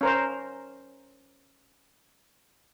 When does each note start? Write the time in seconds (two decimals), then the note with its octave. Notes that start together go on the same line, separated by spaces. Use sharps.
0.01 C#4 A#4 C5